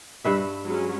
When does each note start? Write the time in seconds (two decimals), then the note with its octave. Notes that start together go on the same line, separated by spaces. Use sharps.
0.24 G2 B4 E5
0.65 F#3 G#3 C#4